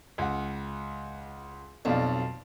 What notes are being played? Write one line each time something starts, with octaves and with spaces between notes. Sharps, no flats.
C#2 F#5
B1 F2 D5 F5